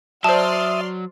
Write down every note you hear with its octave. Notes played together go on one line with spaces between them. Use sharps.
F#3 C5 D5 E5 A5 C6 D#6 F6